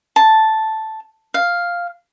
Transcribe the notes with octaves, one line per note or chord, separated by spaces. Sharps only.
A5
F5